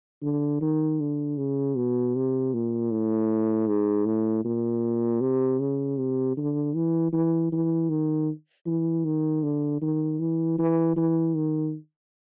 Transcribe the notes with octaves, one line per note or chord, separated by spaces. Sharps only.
D3
D#3
D3
C#3
B2
C3
A#2
A2
G#2
A2
A#2
C3
C#3
C3
D3
E3
E3
E3
D#3
E3
D#3
D3
D#3
E3
E3
E3
D#3